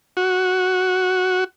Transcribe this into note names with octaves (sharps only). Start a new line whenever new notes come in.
F#4